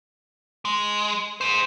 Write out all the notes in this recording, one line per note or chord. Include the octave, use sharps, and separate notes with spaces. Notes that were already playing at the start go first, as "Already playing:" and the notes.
G#3
G#4 C5